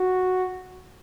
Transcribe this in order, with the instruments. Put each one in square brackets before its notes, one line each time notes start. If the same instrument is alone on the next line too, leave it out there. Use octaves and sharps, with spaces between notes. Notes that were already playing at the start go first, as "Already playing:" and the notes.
Already playing: [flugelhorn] F#4